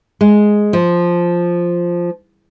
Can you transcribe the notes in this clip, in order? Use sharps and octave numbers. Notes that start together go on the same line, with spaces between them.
G#3
F3